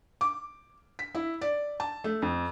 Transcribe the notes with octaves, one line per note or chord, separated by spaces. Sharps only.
D6
B6
E4
D5
A5
A3
F2